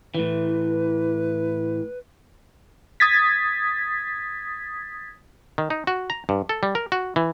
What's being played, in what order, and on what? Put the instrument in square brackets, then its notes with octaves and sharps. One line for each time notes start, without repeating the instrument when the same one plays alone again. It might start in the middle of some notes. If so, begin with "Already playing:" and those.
[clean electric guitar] A2 E3 [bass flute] B4
[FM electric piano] D#6 G#6 A6 B6
[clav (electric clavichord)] D#3
D#4
F#4
A#5
G2
A4
G3
A#4
F#4
E3